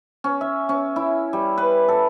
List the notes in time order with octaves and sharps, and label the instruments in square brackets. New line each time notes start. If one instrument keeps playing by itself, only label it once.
[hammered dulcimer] C#4
E5
C#4
E4
G3
B4
A4